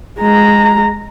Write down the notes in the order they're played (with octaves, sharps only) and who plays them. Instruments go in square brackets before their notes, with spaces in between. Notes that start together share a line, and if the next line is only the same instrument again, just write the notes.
[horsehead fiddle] G#3 A#5